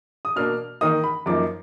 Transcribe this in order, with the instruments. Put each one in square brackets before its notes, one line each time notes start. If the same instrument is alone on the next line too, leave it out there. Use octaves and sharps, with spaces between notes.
[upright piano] D#6
B2 A#3 D4 F6
D#3 A#3 D#4 D#6
B5
F#2 F3 A#3 D#4 D6